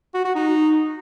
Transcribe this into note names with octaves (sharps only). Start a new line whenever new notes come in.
F#4
F#4
D#4